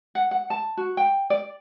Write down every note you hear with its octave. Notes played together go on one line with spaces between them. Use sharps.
F#5
F#5
A5
F#4
G5
D5